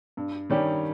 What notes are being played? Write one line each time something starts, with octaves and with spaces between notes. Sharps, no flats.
G2
D#3 G3 C#4 G4